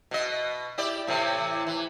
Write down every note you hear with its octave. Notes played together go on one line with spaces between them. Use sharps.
B2 D#5
E4 G4 D5
A2 C3 E3
E3